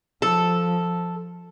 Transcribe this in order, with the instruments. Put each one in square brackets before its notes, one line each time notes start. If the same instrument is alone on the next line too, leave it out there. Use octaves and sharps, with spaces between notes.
[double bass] F3 [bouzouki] A4